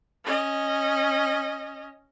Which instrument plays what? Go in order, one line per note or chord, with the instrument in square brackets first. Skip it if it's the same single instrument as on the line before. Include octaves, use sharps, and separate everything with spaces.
[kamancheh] C#4 D#5